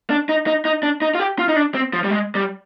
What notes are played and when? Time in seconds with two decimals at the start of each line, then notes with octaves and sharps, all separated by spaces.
0.10 D4
0.29 D#4
0.47 D#4
0.65 D#4
0.83 D4
1.02 D#4
1.15 F4
1.20 G4
1.39 F4
1.48 D#4
1.56 D4
1.74 C4
1.93 F3
2.04 G3
2.10 G#3
2.35 G3